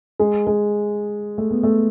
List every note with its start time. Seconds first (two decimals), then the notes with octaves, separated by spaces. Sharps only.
0.20 G#3
0.47 G#3
1.38 A3
1.51 B3
1.63 A3